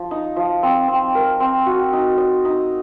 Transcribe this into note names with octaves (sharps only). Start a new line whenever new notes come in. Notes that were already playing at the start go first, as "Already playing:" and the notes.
Already playing: F3
D#4
F3
C4
C4
A#4
C4
F#4
D#4
D#5
D#4